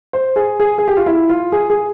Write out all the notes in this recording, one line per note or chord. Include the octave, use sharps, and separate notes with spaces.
C5
G#4
G#4
G#4
G4
F4
E4
F4
G#4
G#4